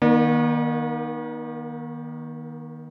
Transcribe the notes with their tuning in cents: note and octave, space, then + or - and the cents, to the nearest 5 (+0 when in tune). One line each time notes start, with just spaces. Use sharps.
D#3 +0 A#3 +45 D5 +45